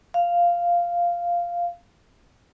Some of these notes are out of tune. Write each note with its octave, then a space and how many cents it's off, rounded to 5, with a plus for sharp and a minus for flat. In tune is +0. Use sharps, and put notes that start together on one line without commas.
F5 -5